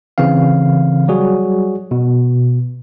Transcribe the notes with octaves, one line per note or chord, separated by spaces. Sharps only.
C#3 E3 C4 F5
F#3 G3 F#4 G#4
B2